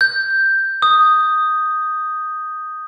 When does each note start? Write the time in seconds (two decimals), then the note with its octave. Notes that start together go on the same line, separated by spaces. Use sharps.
0.01 G6
0.82 D#6